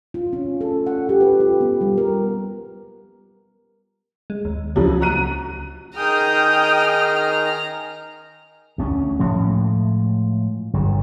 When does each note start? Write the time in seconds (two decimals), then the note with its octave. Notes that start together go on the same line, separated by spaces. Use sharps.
0.14 F4
0.33 C#4
0.61 A4
0.87 F#5
1.09 G4
1.21 B4
1.40 F4
1.61 B3
1.81 G3
1.98 A#4
4.30 G#3
4.45 D#2
4.76 C#2 C#3 F3 F#3
5.02 A#5 F#6 D#7
5.96 D#3 D#4 G#4 G5 A#5 D#6 F6
8.78 D2 C4 C#4
9.19 A2 F3 G#3
10.73 G1 F#3